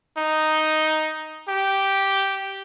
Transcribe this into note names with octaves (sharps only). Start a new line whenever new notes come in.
D#4
G4